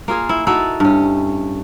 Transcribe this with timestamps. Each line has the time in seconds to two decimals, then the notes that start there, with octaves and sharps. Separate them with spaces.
0.08 A#3 F4 G#4
0.29 E4
0.47 D#4 E4 F#4 A4
0.80 G2 C#4